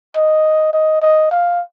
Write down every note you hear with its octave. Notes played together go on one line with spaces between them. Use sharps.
D#5
D#5
D#5
F5